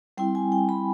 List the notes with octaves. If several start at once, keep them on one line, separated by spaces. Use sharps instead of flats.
G3 C4 E4 G5
G#5
G5
B5